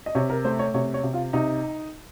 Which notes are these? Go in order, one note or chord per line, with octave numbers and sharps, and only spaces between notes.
D#5
C3 C#5
A#4
A3 C5
C#5
C3 C#5
C#5
C3
F4
C3 D#4